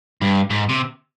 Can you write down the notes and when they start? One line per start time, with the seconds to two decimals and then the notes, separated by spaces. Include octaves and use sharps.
0.21 G2
0.50 G#2
0.69 C3